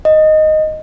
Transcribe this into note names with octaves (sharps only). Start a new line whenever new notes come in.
D#5